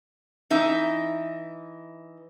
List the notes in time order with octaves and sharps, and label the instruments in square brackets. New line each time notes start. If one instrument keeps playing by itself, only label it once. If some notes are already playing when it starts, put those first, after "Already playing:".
[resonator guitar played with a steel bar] E3 D#4 E5